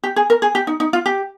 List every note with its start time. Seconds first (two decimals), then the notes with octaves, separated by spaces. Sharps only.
0.04 G4
0.16 G#4
0.30 A#4
0.42 G#4
0.55 G4
0.67 D#4
0.80 D#4
0.93 F4
1.06 G4